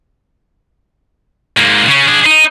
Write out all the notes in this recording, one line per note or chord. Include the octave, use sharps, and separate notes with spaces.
G#2 A#3
C#3 C#4
D4 G#4
D#4